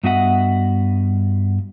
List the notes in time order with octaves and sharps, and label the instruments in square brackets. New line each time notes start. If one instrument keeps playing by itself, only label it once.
[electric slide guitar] G2 B3 F#4 D#5 E5 F#5